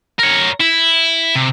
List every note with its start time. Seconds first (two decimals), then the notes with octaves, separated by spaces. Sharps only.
0.19 A#4 C#5
0.60 E4
1.36 C3